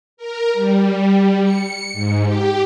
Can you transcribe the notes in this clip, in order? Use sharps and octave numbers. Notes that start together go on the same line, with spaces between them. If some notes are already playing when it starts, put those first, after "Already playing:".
A#4
G3
C#7
G#2
G4